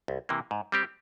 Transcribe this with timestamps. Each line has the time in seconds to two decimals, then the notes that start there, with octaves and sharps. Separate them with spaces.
0.08 C2
0.29 C3 E3 A#3
0.51 G#2
0.72 G3 C4 G4